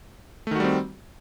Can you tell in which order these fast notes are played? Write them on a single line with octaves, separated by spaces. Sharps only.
A3 D#3 F#4 G3 C4